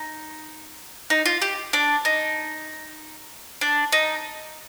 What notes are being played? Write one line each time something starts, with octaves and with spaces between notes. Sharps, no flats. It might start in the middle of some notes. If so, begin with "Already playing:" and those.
Already playing: D#4
D#4
F4
G4
D4
D#4
D4
D#4